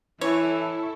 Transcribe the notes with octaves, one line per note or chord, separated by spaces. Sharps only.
E3 E4 A4 C#5